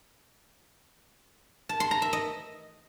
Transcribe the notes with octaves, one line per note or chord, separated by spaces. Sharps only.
A5
C6
A#5
E5
D#5